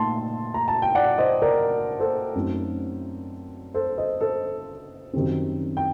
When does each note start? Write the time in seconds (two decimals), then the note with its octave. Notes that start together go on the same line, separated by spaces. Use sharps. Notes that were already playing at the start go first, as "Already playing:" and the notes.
Already playing: A#2 A3 D#4 A5 C6
0.54 A#5
0.68 A5
0.82 G5
0.95 D5 F#5
1.18 C5 D#5
1.42 A#4 D5
2.00 A4 C5
2.35 F#2 F#3 A3 C4 D#4
3.74 A4 C5
3.98 C5 D#5
4.21 A4 C5
5.13 F#2 D#3 G3 C4
5.77 G5